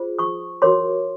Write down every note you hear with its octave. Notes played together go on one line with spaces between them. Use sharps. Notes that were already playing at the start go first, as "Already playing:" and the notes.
Already playing: F4 G#4 C5
C#6 D#6
F#4 A#4 C#5 C6 D6